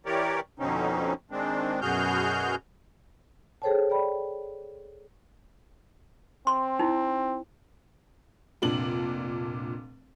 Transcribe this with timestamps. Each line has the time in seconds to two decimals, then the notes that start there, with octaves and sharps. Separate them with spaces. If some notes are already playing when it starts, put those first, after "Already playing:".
0.06 E3 G4 A#4 C#5 D5
0.59 F2 B2 D3 C4 C#4 D#4
1.31 D#3 G#3 C4 D4
1.82 F#2 B2 F#4 G#4 F6 G6
3.62 G#4 A4 C5 C#5 G5 A5
3.90 D5 G5 B5
6.47 C4 C6
6.79 D#4 E4
8.62 F1 A#2 D4 F#7